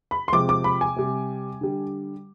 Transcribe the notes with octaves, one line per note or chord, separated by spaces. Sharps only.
B5
C6
C3 F3 G#3 D6
D6
B5
G#5
C3 G3
D3 G3